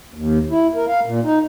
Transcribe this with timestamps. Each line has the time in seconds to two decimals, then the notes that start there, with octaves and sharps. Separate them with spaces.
0.14 D#2
0.50 E4
0.75 A#4
0.88 F5
1.06 A#2
1.24 D#4